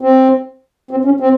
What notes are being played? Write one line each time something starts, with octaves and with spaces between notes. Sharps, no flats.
C4
C4
C#4
C4